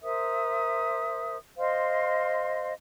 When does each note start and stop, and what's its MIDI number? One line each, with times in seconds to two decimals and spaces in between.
0.02 1.37 70
0.02 1.37 72
0.02 1.37 76
0.02 1.37 87
1.58 2.72 72
1.58 2.72 75
1.58 2.72 77
1.58 2.72 84